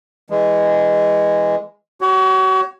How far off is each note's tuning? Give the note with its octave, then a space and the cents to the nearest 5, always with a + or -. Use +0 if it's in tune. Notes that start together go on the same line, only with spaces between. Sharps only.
E3 +0 G#3 -15
F#4 +35 C#5 +0